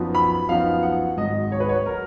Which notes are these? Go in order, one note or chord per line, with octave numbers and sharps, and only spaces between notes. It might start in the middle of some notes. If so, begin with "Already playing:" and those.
Already playing: F#2 F3 B3 D#4
B5
F#2 F3 B3 D#4 F5
F#5
G#1 G#2 F#3 D#5
C#5
B4
C#5
F#3 A#4